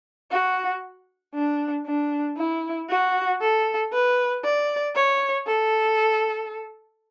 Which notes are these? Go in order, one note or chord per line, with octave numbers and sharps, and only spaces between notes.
F#4
D4
D4
E4
F#4
A4
B4
D5
C#5
A4